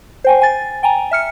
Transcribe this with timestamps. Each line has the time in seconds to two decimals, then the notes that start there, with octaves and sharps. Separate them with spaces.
0.24 C5 G5 G#5
0.42 G#5 A6
0.83 G5 G#5 A#5
1.11 E5 F6 C#7